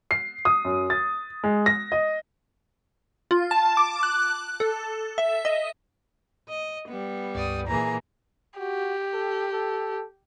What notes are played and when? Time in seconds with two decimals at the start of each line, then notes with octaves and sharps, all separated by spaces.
0.11 C7
0.45 D#6
0.65 F#2
0.90 A6
1.44 G#3
1.66 A#6
1.92 D#5
3.31 F4
3.51 A5
3.77 D6
4.03 F#6
4.60 A4
5.18 E5
5.45 D#5
6.49 D#5
6.89 G3 B3
7.35 C#2 G2 D5 D#6
7.67 A#2 E3 A#3 G#4 A#5
8.59 F#4 G4
9.14 A4
9.53 A4